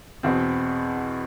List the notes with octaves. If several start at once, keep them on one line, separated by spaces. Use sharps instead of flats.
E2 B2 C4